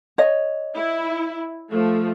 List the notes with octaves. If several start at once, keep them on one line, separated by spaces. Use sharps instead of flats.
C#5 D#5
E4
F3 A3